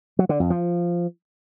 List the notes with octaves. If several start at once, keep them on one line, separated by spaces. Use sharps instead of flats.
F#3
D3
F2
F3